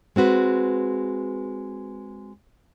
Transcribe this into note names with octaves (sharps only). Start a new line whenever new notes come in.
G#3 C4 F#4 B4